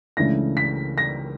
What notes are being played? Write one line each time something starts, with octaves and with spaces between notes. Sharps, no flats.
C#2 C#3 E3 A3 D4 A#6
B6
A#6